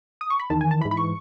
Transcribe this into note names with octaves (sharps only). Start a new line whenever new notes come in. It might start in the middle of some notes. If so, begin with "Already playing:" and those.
D#6
C#6
B5
E2 D#3 A5
G#5
A5
G#2 E3 B5
B5
C#6